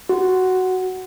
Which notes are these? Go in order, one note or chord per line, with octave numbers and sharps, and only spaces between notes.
F#4